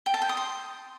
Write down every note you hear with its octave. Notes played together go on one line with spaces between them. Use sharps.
G5
A5
G5
D#6
C6